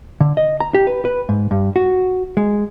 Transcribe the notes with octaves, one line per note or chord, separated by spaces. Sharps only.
D3
D#5
A#5
G4
B4
B4
G#2
G2
F#4
G#3